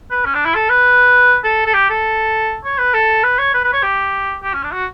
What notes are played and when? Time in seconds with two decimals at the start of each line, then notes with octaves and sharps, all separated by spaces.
0.11 B4
0.25 C#4
0.34 D4
0.45 E4
0.55 A4
0.69 B4
1.44 A4
1.66 A4
1.74 G4
1.89 A4
2.64 C#5
2.78 B4
2.94 A4
3.24 B4
3.39 C#5
3.54 B4
3.64 B4
3.73 C#5
3.83 G4
4.42 G4
4.53 C#4
4.63 D4
4.72 F#4